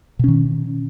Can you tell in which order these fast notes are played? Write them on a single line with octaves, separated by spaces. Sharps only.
B2 C#4 D#3